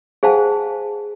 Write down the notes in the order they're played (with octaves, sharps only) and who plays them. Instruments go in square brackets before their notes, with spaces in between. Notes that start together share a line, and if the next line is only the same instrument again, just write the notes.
[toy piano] G#4 C5 F5 F#5 G#5 A5